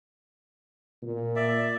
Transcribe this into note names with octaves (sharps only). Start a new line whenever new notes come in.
A#2
D5 E5